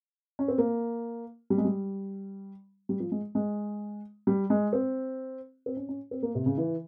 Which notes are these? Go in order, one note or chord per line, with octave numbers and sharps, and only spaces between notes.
C#4
C4
A#3
G3
G#3
G3
G3
F3
G#3
G#3
G3
G#3
C4
C4
C#4
C#4
C4
A#3
C3
C#3
E3